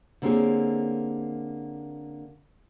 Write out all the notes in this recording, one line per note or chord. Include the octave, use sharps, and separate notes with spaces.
D3 A#3 C4 C#4 G4 G#4